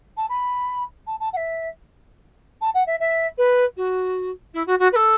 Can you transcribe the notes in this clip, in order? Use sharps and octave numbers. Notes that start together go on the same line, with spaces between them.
A5
B5
A5
A5
F#5
E5
A5
F#5
E5
E5
B4
F#4
E4
F#4
F#4
B4
A4